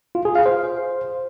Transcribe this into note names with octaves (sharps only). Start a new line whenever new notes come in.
F4
G#4
F5
C5